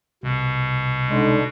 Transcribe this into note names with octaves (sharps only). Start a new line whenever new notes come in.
C2 B2
D3 G#3 D#4